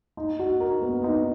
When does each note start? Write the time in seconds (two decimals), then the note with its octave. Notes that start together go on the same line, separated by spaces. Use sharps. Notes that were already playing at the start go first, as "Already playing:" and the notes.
0.17 D#4
0.39 F#4
0.60 A#4
0.82 B3
1.04 D#4